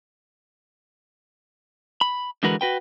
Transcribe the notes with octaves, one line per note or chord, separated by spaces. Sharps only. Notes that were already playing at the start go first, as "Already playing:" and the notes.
B5
D3 E3 G#3 F#4 A#4 B4
F#4 B4 G5